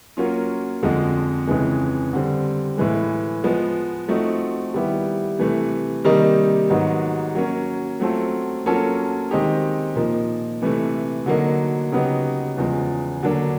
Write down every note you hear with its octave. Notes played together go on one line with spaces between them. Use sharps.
F#3 A#3 C#4 F4
F2 D3 F3 G#3
F2 C#3 E3 G#3
D3 G3 C4
A2 E3 G#3
F3 G#3 B3
F3 A3 C4 D#4 F#4
D#3 G3 B3 E4 G4
C3 E3 A3
C3 D#3 G3 A#3 D#4
G#2 D#3 F#3 B3 D#4
F#3 A#3 C#4
F#3 A3 C4 F4 A4
F#3 A#3 C#4 F4 A4
D#3 G#3 C4 D#4 G4
A#2 F3 A#3 D#4
C3 E3 A3
D3 F#3 A#3 D#4
C#3 F#3 B3 D#4 G4
E2 C#3 F3 G#3
D3 F#3 A#3 D4